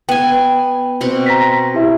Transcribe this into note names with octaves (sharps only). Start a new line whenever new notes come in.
B3 G5 G#5
B2 C4 F#5
A#5 A#6 B6
E4 G4 E5